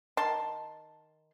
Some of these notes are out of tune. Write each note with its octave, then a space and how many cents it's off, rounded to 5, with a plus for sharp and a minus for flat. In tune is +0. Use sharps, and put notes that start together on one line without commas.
D#3 +0 A5 +0 C6 +0